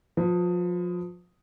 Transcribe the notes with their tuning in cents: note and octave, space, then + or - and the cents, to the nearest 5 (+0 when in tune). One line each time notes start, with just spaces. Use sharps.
F3 +30 B4 +40